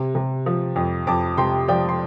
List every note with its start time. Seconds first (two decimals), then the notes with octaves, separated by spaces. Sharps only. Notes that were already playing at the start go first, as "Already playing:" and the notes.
Already playing: C3
0.15 C3
0.46 F3
0.76 F2
1.07 F2 A5 D6
1.37 C3 G5 C6
1.68 F3 D5 G5
1.89 C6